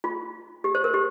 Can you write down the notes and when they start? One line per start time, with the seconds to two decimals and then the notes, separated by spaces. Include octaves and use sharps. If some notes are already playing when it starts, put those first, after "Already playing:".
0.04 F4
0.64 G4
0.75 C5
0.84 A#4
0.94 G4